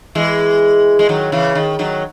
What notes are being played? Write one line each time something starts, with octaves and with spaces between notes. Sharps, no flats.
E3 G#3
G#3
D#3 F#3
C#3 E3
D#3
D#3 F#3